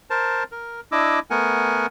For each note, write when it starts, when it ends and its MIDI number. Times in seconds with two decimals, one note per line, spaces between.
0.10 0.43 70
0.10 0.43 72
0.10 0.43 81
0.52 0.80 70
0.92 1.19 62
0.92 1.19 64
0.92 1.19 75
0.92 1.19 86
0.92 1.19 88
1.30 1.86 57
1.30 1.86 59
1.30 1.86 70
1.30 1.86 78
1.30 1.86 80